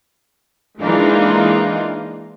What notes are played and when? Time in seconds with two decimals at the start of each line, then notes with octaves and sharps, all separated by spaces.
0.80 E3 G#3 A#3 D4 D#4 F4